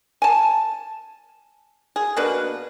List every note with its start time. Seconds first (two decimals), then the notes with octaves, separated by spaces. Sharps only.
0.22 G#5 A5
1.96 G#4
2.17 B2 A#3 D4 B4